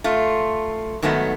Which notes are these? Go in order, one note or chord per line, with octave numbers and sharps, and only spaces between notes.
A3 F4
G#2 D#3 F#3 A3 B3